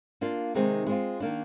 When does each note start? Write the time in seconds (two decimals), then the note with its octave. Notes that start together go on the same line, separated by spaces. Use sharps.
0.21 A#3 D4 F4
0.55 C3 D#3 G#3 C4 D#4
0.87 G#3 C4 F4
1.20 D#3 A#3 D4